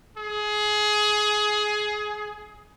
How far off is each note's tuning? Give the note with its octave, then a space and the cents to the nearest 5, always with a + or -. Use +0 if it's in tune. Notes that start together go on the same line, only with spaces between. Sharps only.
G#4 +20